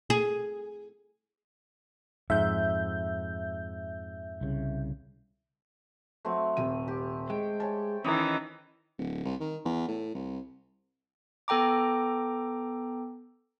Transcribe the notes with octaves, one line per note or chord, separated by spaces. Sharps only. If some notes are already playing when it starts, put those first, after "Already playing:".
G#4
F2 G#2 E5 G6
C2 C#3
F#3 A3 C4
D#1 C3 D#7
G4
G#3 G5
C#5 G#5 A5
D#3 E3 C#4 D#4 D#5 E6
D1
C2
D#3
E2
A2
C2
B3 A4 G5 A#5 D6